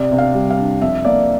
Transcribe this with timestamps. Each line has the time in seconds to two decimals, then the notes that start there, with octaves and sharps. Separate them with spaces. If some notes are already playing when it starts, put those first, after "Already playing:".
Already playing: C3 D5
0.11 C3
0.18 F5
0.35 G3
0.50 F5
0.58 D4
0.81 F2 E5
1.05 A#3 D5